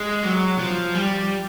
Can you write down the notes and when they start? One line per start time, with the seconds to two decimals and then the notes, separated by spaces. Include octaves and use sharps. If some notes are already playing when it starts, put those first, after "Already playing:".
Already playing: G#3
0.23 F#3
0.59 F3
0.95 G3